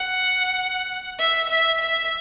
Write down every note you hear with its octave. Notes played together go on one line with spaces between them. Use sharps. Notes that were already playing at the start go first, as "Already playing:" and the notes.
Already playing: F#5
E5
E5
E5